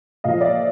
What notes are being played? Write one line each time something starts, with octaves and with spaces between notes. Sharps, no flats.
A#2 F3 D#5 F5
D5 E5